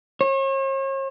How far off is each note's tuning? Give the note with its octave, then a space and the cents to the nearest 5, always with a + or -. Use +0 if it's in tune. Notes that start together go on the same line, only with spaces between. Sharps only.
C#5 -40